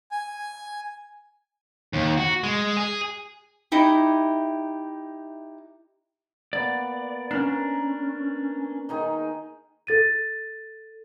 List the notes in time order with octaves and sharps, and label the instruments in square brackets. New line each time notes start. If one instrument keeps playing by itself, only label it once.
[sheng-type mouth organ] G#5
[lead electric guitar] D#2
F#4
G#3
G#4
[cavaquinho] D#4 E4 G4
[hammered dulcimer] A#3 B3 [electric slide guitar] D5
[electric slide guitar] C#4 D4 [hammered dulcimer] A#4
[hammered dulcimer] D#3 D#4 G#4
[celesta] A4 A6 D#7